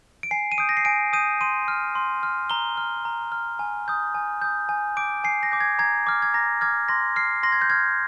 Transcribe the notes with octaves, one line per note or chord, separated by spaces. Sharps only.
D7
G#5 C7
D#7
D#6 G6 D7
A#6
C7
G#5 D7
D#6 G6 D#7
C6 D#7
F6
C6
F6
A#5 G7
F6
A#5
F6
G#5
D#6 G6
G#5
D#6 G6
G#5
D6 G6 D7
G#5 C7
A#6
D6 G6
G#6
A#5 G#6
D6 F6
G#6
A#5 A#6
D6 F6 G#6
C6 A#6
F6 C7
C6 A#6
G#6
G6
F6 G#6